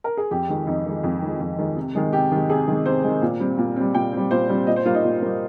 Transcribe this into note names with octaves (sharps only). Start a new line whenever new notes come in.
A#4
G#4
F2 G4
D#3 G#3
F2 D#4
D#3 G#3
F2
D#3 G#3
F2
D#3 G#3
C3
D#3 G#3
C3 G4
D#3 G#3
C3 G#4
D#3 G#3
C3 C5
D#3 G#3
A#2
G3 C4
A#2
G3 C4
A#2 G5
G3 C4
A#2 C5
G3 C4
A#2 D#5
C5
G3 A#3 F4
D#4
A#2
G3 A#3